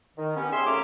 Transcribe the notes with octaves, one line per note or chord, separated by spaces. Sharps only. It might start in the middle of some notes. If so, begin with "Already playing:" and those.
D#3
B3 C#4 G4
G4 G#4 C#5 E5 C6
A#2 A3 C#4 A#5 D6